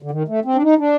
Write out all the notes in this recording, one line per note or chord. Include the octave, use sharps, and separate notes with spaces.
D3
D#3
A3
C4
D4
D#4
D4